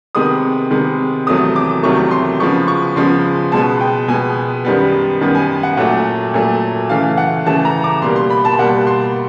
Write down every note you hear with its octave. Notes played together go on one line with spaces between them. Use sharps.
C3 D#3 G#3 B3 D#6
C3 D#3 G#3 B3
E2 C3 D#3 F#3 A3 D#6
D6
E2 C3 D#3 F#3 A3 C#6
C6
C#3 F3 G#3 B3 C#6
C#6
C#3 F3 G#3 B3 C6
B2 G#3 B3 A5
G5
B2 G#3 B3 G#5
F#2 D#3 G3 B3
F#2 D#3 G3 B3
G#5
F#5
A#2 F#3 A3 F#5
A#2 F#3 A3
C#3 E3 A3 F5
F#5
C#3 E3 A3 A5
A#5
D6
B2 G3 A#3 C6
C6
B5
A5
B2 G3 A#3 F#5
C6